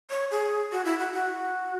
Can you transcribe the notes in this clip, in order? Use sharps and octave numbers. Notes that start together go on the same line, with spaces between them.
C#5
G#4
F#4
E4
F#4
F#4